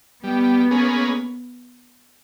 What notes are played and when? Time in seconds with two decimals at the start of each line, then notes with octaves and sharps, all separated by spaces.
0.23 G3 B3
0.71 A#3 C#4 G#4 B4